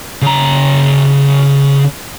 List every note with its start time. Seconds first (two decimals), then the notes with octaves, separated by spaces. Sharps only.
0.22 C#3 A#5